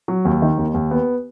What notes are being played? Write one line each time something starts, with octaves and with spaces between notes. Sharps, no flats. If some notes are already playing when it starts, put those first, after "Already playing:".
F#3
D#2
D#3
D#2
D#2
B3